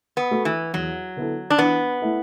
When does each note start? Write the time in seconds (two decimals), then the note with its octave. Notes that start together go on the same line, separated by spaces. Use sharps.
0.17 B3
0.31 A3 F#4 A4
0.45 E3
0.74 E2 F#3
1.16 D3 B3 E4 A4
1.50 D4
1.58 E3 B3
2.01 A3 E4 A4